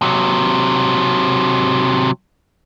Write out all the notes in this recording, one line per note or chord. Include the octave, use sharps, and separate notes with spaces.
C3 F#3